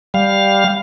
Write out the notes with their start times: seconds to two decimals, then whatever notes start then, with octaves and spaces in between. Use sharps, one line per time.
0.14 G3 F5